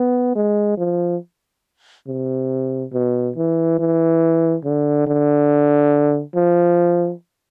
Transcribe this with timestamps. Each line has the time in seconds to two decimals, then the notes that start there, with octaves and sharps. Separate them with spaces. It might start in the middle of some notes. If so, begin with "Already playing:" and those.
Already playing: B3
0.36 G#3
0.78 F3
2.08 C3
2.93 B2
3.36 E3
3.79 E3
4.64 D3
5.07 D3
6.35 F3